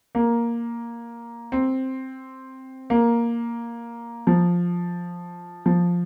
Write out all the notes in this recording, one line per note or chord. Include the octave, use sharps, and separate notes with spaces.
A#3
C4
A#3
F3
F3